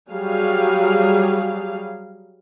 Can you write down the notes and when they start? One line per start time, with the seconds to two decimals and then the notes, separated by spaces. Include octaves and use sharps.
0.11 F#3 G3 G#4 F5